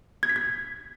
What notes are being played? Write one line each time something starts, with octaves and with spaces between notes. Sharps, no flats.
G#6
B6
G#6